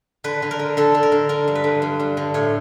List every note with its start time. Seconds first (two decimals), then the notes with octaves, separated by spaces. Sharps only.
0.24 D3 B4
0.42 D3
0.51 A#4
0.59 D3
0.77 D3 A4
0.95 D3
1.03 A#4
1.12 D3
1.29 D3 A#4
1.48 G2
1.55 B4
1.64 D3
1.82 G2
2.00 G2
2.17 D3
2.34 A2 C#5